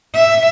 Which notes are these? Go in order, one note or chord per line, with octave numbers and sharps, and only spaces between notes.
E5